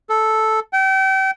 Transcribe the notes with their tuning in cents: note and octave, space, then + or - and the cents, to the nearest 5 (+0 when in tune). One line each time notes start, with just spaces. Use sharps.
A4 -5
G5 -35